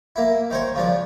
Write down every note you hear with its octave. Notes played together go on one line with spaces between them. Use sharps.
A#3 E4
D#3 C5 C#5
C#3 F3 D4